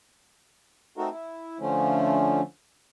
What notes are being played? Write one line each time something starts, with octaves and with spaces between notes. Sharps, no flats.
A3 C4 D#4 F#4 A4 A#4
E4
D3 F3 A3 C#4